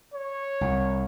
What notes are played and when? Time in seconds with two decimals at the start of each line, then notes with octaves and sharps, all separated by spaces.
0.14 C#5
0.61 C2